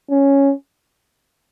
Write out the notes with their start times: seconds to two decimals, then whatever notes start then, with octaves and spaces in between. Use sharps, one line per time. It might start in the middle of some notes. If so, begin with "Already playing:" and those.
0.11 C#4